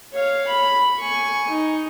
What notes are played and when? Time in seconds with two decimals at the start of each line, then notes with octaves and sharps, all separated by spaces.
0.13 C#5 F5
0.48 B5
0.98 G#5 C#6
1.50 D#4